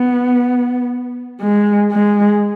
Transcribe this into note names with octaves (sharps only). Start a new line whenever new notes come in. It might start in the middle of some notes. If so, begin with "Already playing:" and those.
Already playing: B3
G#3
G#3